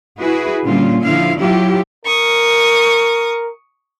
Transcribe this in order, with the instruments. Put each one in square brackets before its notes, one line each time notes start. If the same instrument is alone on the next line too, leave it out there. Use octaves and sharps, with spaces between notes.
[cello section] E4 F#4 G#4 B4
A#2 D3 G3 C#4 F4
D3 F3 E4 F5
F#3 E4 F4 G4
[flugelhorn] A#4 [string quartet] C#6 D#6